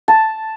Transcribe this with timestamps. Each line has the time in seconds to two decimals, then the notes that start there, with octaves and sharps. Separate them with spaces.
0.08 A5